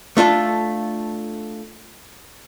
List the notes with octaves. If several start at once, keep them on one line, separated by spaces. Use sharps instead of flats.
A3 D4 F4 A4